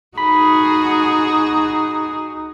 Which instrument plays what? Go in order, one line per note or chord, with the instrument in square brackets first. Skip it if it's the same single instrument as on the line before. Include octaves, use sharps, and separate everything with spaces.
[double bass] D#4 [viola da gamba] F#4 G#4 [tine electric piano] B5